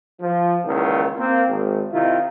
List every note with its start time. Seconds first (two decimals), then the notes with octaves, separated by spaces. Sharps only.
0.20 F3
0.64 C#2 A#2 D#3 E3
1.17 A#3 C4
1.47 G#1
1.91 C3 D#3 E4 F4